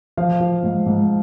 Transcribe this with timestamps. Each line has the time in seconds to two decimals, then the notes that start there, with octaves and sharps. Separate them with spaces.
0.17 F3 F5
0.40 F3
0.63 G#2
0.86 G#2